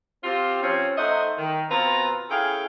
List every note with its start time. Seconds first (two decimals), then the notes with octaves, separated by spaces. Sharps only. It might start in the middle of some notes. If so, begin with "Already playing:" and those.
0.24 C4 F4 G4
0.62 F3 C4 C#4
0.97 A3 D#4 C5 D#5 E5 F#5
1.37 D#3
1.70 B2 C4 F4 B4 A#5
2.30 C#4 E4 G#4 A4 F5 G5